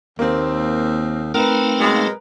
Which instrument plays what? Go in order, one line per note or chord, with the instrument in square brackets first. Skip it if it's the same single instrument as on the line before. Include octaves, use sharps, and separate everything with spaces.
[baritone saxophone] D#2 [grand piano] A#3 C4
[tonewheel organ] A3 D#4 F5 [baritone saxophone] C4 [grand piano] A#4 B4
[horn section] B2 F#3 G#3